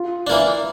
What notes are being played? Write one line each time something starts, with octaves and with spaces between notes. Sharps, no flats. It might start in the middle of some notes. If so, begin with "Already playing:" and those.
Already playing: F4
E3 A#3 D4